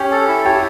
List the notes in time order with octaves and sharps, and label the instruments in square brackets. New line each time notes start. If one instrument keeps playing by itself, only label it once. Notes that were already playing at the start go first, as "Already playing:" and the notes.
Already playing: [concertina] C#4 [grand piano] G4
[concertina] A4
E4
[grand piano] G4 [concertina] C#5